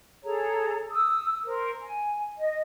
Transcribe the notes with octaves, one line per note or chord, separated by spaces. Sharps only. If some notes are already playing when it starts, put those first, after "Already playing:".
G#4 A4 C#5 A#5
D#6 E6
A#4 C5
G#5
D#5